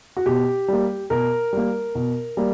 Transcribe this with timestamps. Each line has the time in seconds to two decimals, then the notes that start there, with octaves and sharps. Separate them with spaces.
0.17 F#4
0.26 B2 G4
0.68 G3 A#3
1.10 B2 A#4
1.53 G3 A#3
1.95 B2
2.37 G3 A#3